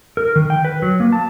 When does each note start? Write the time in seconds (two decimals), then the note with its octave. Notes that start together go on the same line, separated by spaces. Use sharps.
0.17 A#4
0.36 D#3
0.50 G5
0.65 B4
0.82 F#3
1.00 A#3
1.12 A5